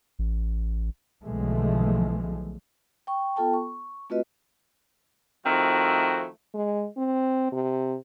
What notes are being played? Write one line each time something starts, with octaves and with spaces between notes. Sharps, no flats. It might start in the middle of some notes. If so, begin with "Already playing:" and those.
A1
B1 D3 E3 F3 G#3 A3
G5 C#6
B3 F4 A4 G5 A5
C#6
A3 C4 F4 F#4 B4 D#5
D#3 F3 A3 C4 E4 F#4
G#3
C4
C3